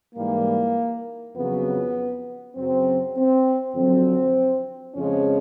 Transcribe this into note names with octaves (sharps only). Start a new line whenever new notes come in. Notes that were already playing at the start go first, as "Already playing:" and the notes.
G#2 E3 G3 A#3
F2 C#3 F#3 B3
F#2 C#3 F#3 C4
C4
F2 D3 F#3 C4
F2 C#3 F3 G#3 C#4